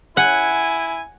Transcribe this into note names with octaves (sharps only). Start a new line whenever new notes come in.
E4 F#5 G#5